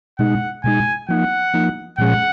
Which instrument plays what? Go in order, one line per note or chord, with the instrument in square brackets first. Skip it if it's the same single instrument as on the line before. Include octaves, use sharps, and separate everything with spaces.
[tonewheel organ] B2 G#3 D#4 [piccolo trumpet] F#5
[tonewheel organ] B2 G#3 D#4 [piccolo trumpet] G#5
[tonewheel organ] F3 A#3 D#4 [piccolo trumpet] F#5
[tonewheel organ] F3 A#3 D#4
[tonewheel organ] A#2 F3 G#3 C#4 G#4 [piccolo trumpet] F#5